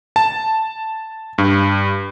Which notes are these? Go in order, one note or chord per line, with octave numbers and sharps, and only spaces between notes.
A5
G2